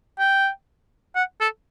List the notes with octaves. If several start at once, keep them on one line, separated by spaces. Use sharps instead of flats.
G5
F#5
A4